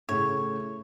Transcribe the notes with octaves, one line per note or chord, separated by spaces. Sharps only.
A2 C#3 C#5